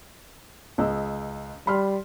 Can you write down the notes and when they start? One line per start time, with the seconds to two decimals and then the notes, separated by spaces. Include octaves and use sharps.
0.78 C#2 D#5 E6
1.67 G3 B5 C6 F6